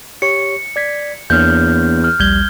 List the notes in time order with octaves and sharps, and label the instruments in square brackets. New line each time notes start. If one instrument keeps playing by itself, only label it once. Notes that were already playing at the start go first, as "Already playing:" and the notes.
[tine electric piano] G4 C#5 C#6 [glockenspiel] C#7
[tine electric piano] D5 G#6 B6
[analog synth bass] E2 [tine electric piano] A#3 D4 C#5 [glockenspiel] F6 G6
[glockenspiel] F6
[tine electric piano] A#1 D#2 G3 [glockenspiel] G6 G#6 G7